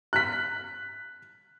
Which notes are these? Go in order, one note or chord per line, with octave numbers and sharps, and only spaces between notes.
F#6 B6